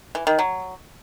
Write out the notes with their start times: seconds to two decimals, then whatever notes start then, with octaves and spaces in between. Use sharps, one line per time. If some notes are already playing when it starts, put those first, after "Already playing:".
0.15 E3
0.27 D#3
0.39 F#3